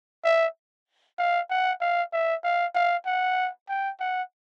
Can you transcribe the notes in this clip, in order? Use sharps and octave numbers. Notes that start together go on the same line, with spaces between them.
E5
F5
F#5
F5
E5
F5
F5
F#5
G5
F#5